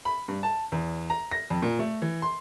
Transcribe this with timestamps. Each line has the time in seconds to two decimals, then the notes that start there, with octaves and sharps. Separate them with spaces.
0.05 B5
0.28 G2
0.43 A5
0.72 E2
1.10 A#5
1.31 A#6
1.50 F2
1.62 A#2
1.79 A3
2.02 E3
2.22 C6